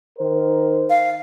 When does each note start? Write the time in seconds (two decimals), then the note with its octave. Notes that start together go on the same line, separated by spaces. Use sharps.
0.19 D#3 A#4 C5
0.90 F5